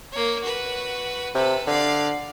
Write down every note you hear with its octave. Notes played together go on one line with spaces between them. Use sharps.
A#3 C#5
F#4 B4
C3 A4 B4
D3 D5 F5